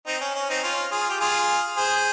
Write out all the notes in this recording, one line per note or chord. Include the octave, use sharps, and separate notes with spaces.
C4 D#4
C#4
C#4
C4 D#4
C#4 F4
F4 G#4
G4
F4 G#4
G#4 C5